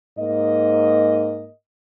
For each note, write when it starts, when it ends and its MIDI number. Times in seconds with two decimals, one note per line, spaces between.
0.18 1.48 44
0.18 1.48 58
0.18 1.48 75